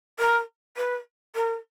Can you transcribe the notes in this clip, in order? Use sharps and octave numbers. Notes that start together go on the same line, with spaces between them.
A#4
B4
A#4